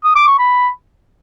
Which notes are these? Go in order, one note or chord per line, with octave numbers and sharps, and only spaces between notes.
D#6
D6
C#6
B5